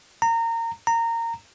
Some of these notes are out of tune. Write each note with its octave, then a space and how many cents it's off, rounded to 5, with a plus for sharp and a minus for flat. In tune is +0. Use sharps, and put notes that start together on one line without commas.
A#5 -25
A#5 -20